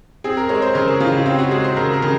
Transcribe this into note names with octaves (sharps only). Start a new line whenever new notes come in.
C4 G#4
A#4
G#3 C#5
C5
C#3 A#4
G#4
C#3 F4
F4
C4 F4
F#4
G#3 G#4
C5
C#3 A#4
A#4
C#3